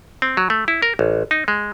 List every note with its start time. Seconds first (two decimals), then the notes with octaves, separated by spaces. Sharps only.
0.22 C4
0.37 F#3
0.50 A3
0.68 E4
0.82 A#4
0.99 A1
1.31 D#4
1.48 G#3